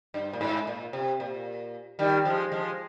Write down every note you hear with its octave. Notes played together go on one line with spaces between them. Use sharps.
G2
A#2
G#2
A#2
C3
A#2
D#3 G3
F3 G#3
F3 G#3